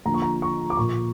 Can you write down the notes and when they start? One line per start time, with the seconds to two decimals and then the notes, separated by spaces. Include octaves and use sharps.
0.06 D3 F3 A#3 A#5
0.14 C#6
0.22 A#5
0.42 C#6
0.70 D6
0.77 A#2 F3 A#3 C#6